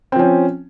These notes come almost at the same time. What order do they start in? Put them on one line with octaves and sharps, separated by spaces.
C4 F3 C#4